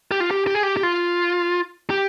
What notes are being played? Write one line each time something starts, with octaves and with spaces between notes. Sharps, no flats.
G4
F4
G4
G4
G#4
G4
G4
F4
G4